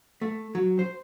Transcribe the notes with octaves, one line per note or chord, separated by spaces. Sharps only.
A3
F#3
C5